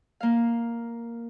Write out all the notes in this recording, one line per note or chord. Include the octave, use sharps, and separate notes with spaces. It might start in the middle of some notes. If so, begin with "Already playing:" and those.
A#3 F5